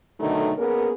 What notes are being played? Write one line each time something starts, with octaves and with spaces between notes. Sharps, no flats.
B2 D3 D#3 F#3 A3 D#4
A#3 B3 C#4 G#4 A#4